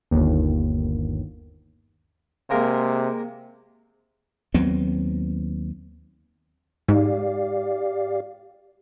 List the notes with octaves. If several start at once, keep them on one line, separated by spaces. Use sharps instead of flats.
G1 D#2
C3 G#3 A#3 A#4
D#2 F#3 B3 C4
G#2 G4 D5 F5